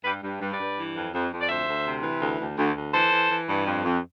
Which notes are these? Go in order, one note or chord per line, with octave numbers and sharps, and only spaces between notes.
G2 G4 B4
G2
G2
B4 D5
G2
E3
F2
F2
F2
D5
D2 C5 E5
D2
C3
E3
D2
D2
D2
D2
E3 A4 C5
E3
E3
G2
F2
F2